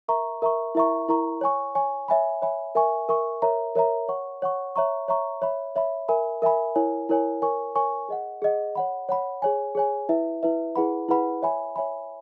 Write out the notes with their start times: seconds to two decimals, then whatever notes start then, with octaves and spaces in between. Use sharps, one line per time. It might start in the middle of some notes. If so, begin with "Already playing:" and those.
0.08 A#4 E5 A#5 C#6
0.42 A#4 E5 A#5 C#6
0.75 E4 A#4 E5 A#5 C#6
1.08 E4 A#4 E5 A#5 C#6
1.41 C#5 G#5 C#6
1.75 C#5 G#5 C#6
2.08 C#5 E5 G#5 B5
2.42 C#5 E5 G#5 B5
2.75 A#4 E5 G#5 C#6
3.09 A#4 E5 G#5 C#6
3.42 A#4 C#5 E5 A#5
3.75 A#4 C#5 E5 A#5
4.08 C#5 F#5 C#6
4.42 C#5 F#5 C#6
4.76 C#5 E5 A#5 C#6
5.08 C#5 E5 A#5 C#6
5.42 C#5 E5 B5
5.76 C#5 E5 B5
6.08 A#4 E5 G#5 B5
6.42 A#4 E5 G#5 B5
6.75 E4 A#4 C#5 G#5
7.09 E4 A#4 C#5 G#5
7.42 A#4 C#5 G#5 C#6
7.75 A#4 C#5 G#5 C#6
8.09 G#4 D#5 F#5
8.42 G#4 D#5 F#5
8.75 C#5 F#5 B5
9.09 C#5 F#5 B5
9.42 G#4 C#5 G#5
9.75 G#4 C#5 G#5
10.09 E4 B4 E5
10.43 E4 B4 E5
10.76 E4 G#4 B4 F#5 B5
11.09 E4 G#4 B4 F#5 B5
11.42 C#5 E5 G#5 B5
11.76 C#5 E5 G#5 B5